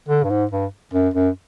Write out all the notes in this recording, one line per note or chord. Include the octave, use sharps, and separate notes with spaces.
D3
G2
G#2
G2
F#2
F#2